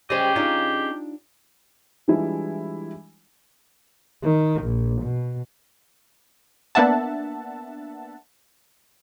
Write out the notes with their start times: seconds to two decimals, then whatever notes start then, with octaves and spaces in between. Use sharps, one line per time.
0.10 G3 C#4 G4 G#4 C5 D#5
0.36 D4 D#4 F4
2.08 E3 G3 G#3 D4 E4 F4
4.23 D#3
4.63 A#1
5.03 B2
6.75 A#3 B3 D4 E5 F#5 A5